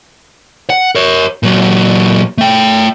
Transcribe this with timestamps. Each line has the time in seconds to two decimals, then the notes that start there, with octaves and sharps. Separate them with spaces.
0.70 F#5
0.95 A#4 C#5
1.43 A#2 F#3
2.38 A3 G5